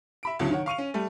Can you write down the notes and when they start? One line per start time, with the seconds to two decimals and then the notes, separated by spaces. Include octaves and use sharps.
0.23 E5 B5 D7
0.39 D2 A2 C#3 F#3
0.51 D#3 C#5 F#5
0.66 F5 C#6 D#7 F7
0.78 C#4
0.94 G3 A3